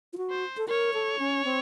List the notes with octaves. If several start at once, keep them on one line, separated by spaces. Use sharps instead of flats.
F4
F#4
C5
A4
A#4 C#5
A4
C#4
C4